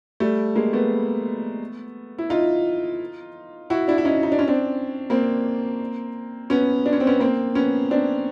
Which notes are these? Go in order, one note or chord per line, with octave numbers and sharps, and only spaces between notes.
G3 A3
G#3 A#3
A3 B3
E4
D#4 F4
E4 F#4
D4 E4
E4
C#4 D#4
D#4
D4
C#4
C4 D4
A#3 C4
B3 C#4
D4
C#4
C4
B3 C#4
A#3 C4
B3 C#4
C4 D4